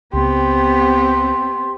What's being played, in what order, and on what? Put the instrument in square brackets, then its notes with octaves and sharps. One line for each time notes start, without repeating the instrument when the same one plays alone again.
[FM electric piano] C#2 [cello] B3 C4 [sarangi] G4 [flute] C6